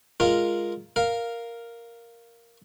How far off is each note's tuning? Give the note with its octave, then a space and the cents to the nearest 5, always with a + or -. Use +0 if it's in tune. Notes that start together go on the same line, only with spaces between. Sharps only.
G#3 +0 F4 -5 A#4 +0
A#4 +0 F5 +0